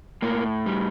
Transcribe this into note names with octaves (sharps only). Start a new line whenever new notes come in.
A2 A#3
G3